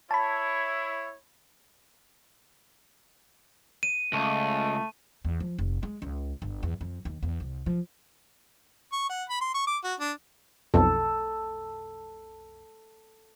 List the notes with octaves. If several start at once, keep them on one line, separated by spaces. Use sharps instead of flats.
E4 C#5 A5 B5
D#7
C#2 A3
E2
F3
F1
G#3
C#2
G1
E2
F2
D#2
E2
C2
F3
C#6
F#5
B5
C6
C#6
D6
F#4
D4
B1 F2 A4